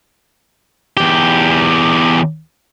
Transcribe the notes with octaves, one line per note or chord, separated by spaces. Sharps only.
E2 G4